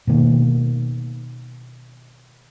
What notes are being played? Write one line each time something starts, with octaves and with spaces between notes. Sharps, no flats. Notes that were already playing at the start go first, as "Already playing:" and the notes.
B2 D#3 A#3